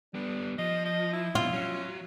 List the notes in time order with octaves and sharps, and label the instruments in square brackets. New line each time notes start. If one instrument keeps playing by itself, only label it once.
[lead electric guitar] G3 B3 [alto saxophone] D4
[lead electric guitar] F3 [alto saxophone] D#5
[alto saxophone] D#5
E4
[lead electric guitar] F2 B2 [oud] F4
[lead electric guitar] F#3 [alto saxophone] C#4